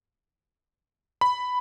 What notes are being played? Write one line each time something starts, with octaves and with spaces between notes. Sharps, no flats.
B5